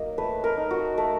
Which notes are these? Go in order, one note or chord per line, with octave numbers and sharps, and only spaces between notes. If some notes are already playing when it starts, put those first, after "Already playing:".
Already playing: F#3 A#3 D#4 D#5
A3 B4
A#4
D#4
F#4
A3